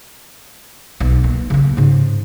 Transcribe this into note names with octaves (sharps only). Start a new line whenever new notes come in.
B1
A#3
C#3 A#3
G#2 C#3